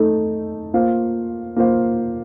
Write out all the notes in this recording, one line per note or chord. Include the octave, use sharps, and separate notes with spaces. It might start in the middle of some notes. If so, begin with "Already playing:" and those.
Already playing: A3 D#4 A4
A#3 F4 C5 F5
A#3 F4 C5 F5